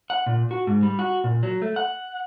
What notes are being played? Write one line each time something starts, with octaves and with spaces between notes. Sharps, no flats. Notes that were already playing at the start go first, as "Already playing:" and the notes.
F#5
A#2
F#4
G#2
G3
F#4
A#2
F#3
A3
F#5